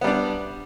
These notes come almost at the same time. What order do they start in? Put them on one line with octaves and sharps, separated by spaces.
B3 G3 D4